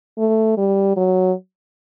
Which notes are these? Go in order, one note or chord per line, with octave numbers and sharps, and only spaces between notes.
A3
G3
F#3